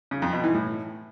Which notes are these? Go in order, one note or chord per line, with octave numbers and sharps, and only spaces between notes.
C#3
F2
B2
E3
A2